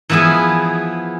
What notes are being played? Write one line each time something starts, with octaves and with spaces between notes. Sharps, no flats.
E3 F3 B3 E4 G#4